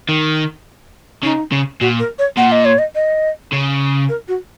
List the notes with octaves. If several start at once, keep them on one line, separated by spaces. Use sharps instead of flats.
D#3
C#3 D#4
C#3
A#2 F#4
A#4
C#5
A#2 F#5
D#5
C#5
D#5
D#5
C#3
A#4
F#4